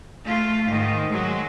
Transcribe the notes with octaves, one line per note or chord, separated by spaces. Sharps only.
A3 F4
G#2 D#3
F#3 G#3